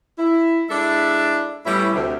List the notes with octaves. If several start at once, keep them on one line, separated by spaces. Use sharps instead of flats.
E4
G#3 D4 E4 A4 D5 E5
A2 G3 B3 C#4 E4
D2 C3